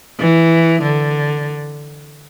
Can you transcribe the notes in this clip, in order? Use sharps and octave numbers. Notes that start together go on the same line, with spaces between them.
E3
D3